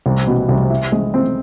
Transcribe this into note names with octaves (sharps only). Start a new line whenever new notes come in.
C2
B2
C2
E4
G#3
C4